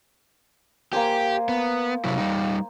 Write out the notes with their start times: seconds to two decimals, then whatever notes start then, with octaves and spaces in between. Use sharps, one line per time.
0.93 A#3 G4 C5 G#5
1.49 B3
2.04 C3 F#3 E4
2.18 G3 D#4